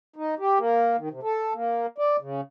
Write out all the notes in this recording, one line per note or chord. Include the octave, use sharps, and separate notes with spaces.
D#4
G4
A#3
D#3
C3
A4
A#3
D5
C#3